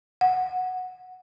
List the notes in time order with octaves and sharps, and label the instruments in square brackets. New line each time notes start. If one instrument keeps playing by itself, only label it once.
[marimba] F#5